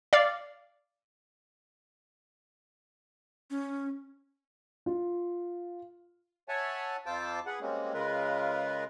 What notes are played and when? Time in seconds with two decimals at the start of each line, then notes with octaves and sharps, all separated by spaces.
0.13 D5 F5
3.51 C#4
4.86 F4
6.49 C#5 E5 F#5 G#5 A5
7.06 F2 F4 C5 A5 D6 E6
7.46 G#4 B4 F#5
7.61 G3 G#3 A#3 C4 C#4
7.94 C#3 G#3 F4 A#4 B4